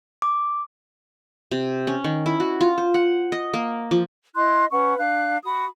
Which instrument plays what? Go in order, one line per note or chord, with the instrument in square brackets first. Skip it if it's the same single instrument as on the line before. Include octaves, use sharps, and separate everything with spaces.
[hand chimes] D6
[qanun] C3
C#4
D#3
E4
F#4
F4
C5
F#5
D#5
A#3
F3
[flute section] E4 D#5 C6 F#6
C#4 B4 F#5 C#6
D4 F5 F#6
F#4 B5 D#6